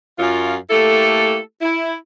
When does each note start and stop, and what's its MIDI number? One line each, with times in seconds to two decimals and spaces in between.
0.19 0.54 42
0.19 0.54 65
0.70 1.37 57
0.70 1.37 58
0.70 1.37 64
0.70 1.37 67
0.70 1.37 69
1.61 1.94 64